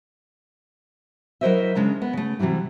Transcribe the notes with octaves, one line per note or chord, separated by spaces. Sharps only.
F#3 E4 A#4 C5 D#5 E5
C#3 G#3 D4 A#5
B3
C#3 A3
C3 E3 F#3 G3 E4